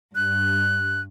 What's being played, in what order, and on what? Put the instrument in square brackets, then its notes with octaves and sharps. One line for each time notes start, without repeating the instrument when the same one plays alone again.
[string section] G2 [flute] F#6